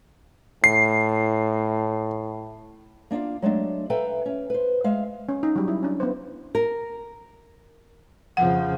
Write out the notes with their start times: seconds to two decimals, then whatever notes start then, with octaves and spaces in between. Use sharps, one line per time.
0.64 A2 C7
3.11 A#3 D4 D#4 F4 F5
3.42 F#3 G#3 A3 D4
3.90 A4 B4 E5 F5 G5 A#5
4.26 C#4
4.50 B4 C5
4.84 G#3 E5 F5
5.29 C#4
5.43 D#4
5.56 F#3 G3
5.68 E4
5.83 C#4 D4
6.00 B3 C5
6.55 A#4
8.37 F2 C#3 F3 F#5